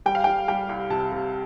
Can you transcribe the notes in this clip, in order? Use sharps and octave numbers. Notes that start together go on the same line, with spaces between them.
G3 G5
F5
G3 G5
G3 G5
C2
C3 A5
C3